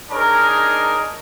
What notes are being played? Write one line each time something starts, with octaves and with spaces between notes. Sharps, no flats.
D4 D#4 G#4 A#4 C#5 D#5